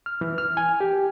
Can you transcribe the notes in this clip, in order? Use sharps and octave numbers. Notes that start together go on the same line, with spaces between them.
F6
E3
F6
G#5
G4